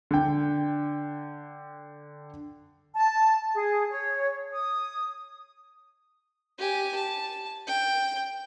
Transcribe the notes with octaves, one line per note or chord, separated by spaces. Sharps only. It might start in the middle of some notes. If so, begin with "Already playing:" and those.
D3 G5
A5
G#4
C#5
D#6
G4 G#5
A5
G5